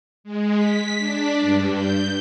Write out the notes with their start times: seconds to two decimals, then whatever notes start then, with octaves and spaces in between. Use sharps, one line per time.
0.24 G#3
0.56 B6
0.98 D4
1.40 G2
1.74 G6